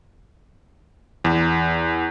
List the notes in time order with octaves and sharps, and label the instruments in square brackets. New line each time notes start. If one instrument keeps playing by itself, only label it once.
[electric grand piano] E2